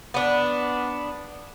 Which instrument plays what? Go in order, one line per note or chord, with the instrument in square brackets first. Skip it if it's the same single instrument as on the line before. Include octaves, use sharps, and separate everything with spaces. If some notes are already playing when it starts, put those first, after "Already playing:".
[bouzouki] B3 D4